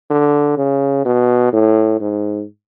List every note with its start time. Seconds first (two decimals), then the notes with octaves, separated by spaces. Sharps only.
0.10 D3
0.58 C#3
1.05 B2
1.53 A2
2.01 G#2